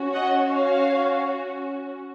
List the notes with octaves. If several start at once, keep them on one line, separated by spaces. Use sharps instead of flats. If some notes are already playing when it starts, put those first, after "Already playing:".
Already playing: C#4 F#4
D#5 F#5
C#5 F5